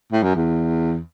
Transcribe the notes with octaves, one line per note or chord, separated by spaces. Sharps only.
A2
F#2
E2